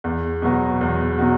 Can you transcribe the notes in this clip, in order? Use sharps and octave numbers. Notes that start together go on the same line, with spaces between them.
E2
B2 F#3 B3 F#4
E2
B2 F#3 B3 F#4